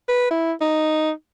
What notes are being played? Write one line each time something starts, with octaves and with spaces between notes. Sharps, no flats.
B4
E4
D#4